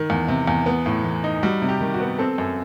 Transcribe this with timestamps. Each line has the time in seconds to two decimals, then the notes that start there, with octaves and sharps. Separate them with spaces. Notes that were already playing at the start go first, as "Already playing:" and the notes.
Already playing: D#3
0.10 E2
0.28 C3
0.48 E2
0.66 B3
0.86 A2
1.04 E3
1.24 D#4
1.43 G3 F#4
1.62 C3
1.69 G4
1.80 D#3
1.94 F#4
2.00 B3
2.19 C4 A4
2.38 F#2